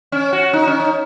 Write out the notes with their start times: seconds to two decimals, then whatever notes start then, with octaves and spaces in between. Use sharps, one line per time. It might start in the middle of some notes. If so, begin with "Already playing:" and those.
0.12 C#4
0.32 F#4
0.53 D#4
0.67 C#4
0.80 D#4